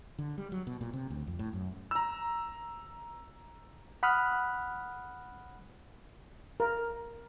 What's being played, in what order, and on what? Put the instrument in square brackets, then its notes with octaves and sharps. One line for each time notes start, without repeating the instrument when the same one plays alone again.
[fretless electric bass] D3
G3
F#3
B2
A#2
C3
D2
F2
A2
F#2
[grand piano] A#5 E6
[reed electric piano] F#5 B5 D#6 F6 F#6
[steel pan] A#4